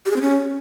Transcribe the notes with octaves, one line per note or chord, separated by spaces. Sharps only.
G4
G#4
C4
C#4